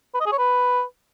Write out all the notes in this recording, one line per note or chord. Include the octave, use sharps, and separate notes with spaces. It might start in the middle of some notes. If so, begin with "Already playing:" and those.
B4
D#5
G#4
C#5
B4